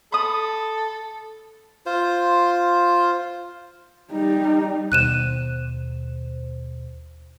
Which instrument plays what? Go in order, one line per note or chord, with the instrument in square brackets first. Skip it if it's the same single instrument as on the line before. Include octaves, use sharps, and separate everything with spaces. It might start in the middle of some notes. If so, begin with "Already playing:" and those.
[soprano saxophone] A4 [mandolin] B5 D#6
[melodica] F4 C5
[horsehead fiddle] G3 D#4
[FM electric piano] D#2 B2 C5 [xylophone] F#6 D#7 E7